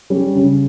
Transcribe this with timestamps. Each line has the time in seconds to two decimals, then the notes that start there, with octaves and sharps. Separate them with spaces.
0.10 G3 C#4
0.36 C#3